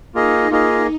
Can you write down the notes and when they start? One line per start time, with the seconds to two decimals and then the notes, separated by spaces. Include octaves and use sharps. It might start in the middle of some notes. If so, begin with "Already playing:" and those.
0.14 A#3 D#4 F4 G#4 D#5
0.51 A#3 F4 G#4 D#5